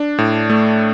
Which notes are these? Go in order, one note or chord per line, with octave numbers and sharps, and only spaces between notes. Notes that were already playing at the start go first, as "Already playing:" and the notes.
Already playing: D4
A2
A3